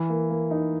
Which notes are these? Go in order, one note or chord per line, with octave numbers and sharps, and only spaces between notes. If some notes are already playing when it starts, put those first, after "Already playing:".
Already playing: E3
A#3
A#3
D#4